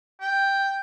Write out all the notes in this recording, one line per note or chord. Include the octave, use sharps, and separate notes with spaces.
G5